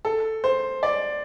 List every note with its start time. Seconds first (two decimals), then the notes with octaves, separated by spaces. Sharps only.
0.05 A4
0.44 C5
0.83 D5